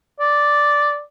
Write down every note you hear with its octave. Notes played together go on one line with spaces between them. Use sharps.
D5